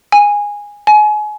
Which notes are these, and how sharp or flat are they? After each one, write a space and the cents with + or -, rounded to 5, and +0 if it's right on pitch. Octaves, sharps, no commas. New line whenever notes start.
G#5 -10
G#5 +30